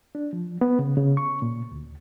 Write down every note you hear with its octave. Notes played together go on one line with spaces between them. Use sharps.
D4
F3
B3
C#3
C#3
C#6
A#2
D2